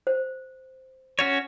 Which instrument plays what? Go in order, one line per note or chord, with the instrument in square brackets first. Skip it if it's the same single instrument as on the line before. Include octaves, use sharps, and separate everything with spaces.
[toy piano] C5
[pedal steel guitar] C#4 F#4 C#5